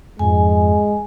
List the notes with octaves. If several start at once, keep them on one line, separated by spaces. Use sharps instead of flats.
F2 G#2 G#3 G#5